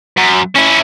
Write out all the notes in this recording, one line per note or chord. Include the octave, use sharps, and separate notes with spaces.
F#2
C#4 E4